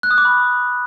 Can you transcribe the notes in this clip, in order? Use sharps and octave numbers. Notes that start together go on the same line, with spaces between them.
F#6
D#6
D6
B5